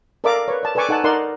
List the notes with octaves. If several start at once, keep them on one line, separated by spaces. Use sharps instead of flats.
A4 A#4 D5 E5 F5 D6
B4 C#5
D5 A5
A4 B4 D5 G#5 C#6 D6
D#4 A4 F#5 G#5 A5
D#4 A#4 D5 F#5 C6